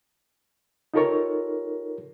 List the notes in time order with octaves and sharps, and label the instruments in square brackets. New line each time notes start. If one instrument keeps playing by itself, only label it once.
[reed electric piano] D#4 F4 G4 A4 A#4 C#5